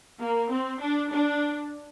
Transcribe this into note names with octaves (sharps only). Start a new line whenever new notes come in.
A#3
C4
D4
D4